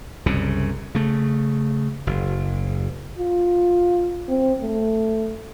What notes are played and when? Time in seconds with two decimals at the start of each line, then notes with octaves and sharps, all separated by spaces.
0.26 C2 F#2 C#3
0.95 C#3 A3
2.07 F#1
3.18 F4
4.28 C4
4.61 A3